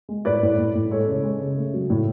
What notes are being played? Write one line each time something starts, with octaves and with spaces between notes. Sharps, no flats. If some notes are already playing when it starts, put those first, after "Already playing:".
G#3
A2 B4 D5
A2
A2
A2
G#3 A4 C#5
C#3
G#3
C#3
A3
F#3
A2